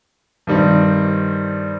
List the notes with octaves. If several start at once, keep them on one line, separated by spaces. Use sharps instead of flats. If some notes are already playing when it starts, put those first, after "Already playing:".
G2 D#3 G3 C4